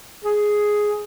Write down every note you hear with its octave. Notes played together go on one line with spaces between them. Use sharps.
G#4